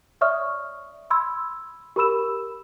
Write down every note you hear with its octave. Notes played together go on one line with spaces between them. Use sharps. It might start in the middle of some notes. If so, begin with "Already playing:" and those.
C#5 D5 E5 C#6 D#6 F6
B5 C6 E6 G#6
G4 A#4 B5 E6 E7